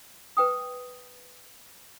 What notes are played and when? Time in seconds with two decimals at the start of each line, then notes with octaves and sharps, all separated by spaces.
0.37 B4 G5 D#6